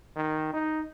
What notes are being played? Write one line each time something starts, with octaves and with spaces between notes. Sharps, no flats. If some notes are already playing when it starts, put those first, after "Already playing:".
D#3
D#4